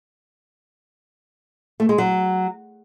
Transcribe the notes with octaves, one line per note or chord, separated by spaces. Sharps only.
A3
G#3
F#3